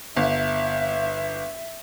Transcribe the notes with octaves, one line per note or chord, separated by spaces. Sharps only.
G1 E5